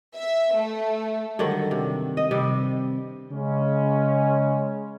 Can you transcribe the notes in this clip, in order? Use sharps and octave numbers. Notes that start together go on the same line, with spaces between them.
E5
A3
G2 D3 D#3 F#3
C3
D#5
C3 G3
C#3 G#3 C#4